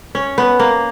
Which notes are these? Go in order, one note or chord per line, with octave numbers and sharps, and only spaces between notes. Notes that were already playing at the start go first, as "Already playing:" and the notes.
C#4
B3
A#3